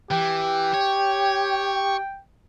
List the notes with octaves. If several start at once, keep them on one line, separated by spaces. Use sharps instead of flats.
E3 G4 G5
C#5